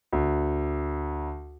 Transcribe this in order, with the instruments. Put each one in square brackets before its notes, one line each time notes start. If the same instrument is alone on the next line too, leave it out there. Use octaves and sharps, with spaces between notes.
[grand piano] D2